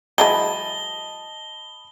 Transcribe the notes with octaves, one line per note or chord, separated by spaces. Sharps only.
E3 F#3 G#3 D#5 A5 B5 G7